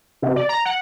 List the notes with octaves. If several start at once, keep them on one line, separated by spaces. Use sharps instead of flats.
C3
D5
A#5
F#5